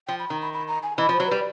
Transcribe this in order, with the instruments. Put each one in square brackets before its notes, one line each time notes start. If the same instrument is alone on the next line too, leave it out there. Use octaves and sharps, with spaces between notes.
[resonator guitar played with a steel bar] F3 [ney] G5
[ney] B5
[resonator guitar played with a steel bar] D#3 [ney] A#5
[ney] B5
B5
A#5
G#5
[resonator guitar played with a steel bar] E3 [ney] D#5
[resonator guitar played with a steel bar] F3
[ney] C5
[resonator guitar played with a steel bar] F#3
[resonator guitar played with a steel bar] G3 [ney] B4